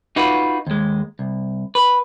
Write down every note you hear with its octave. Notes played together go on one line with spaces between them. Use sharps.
D#4 F4 F#4 B4
D#2 G#3
C2
B4